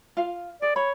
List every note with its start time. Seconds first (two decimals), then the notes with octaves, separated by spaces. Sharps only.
0.17 F4 F5
0.62 G#4 D5
0.76 C#5 B5